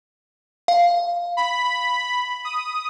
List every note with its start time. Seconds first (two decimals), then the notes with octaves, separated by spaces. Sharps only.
0.68 F5
1.37 B5
2.45 D#6